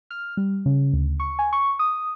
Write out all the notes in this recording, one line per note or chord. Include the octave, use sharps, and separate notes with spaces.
F6
G3
C#3
D2
C#6
G#5
C#6
D#6